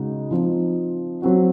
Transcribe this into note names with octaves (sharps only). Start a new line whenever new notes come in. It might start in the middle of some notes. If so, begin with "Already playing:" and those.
Already playing: C#3 G#3 D#4 F#4
F3 C4 D#4
F#3 C4 F#4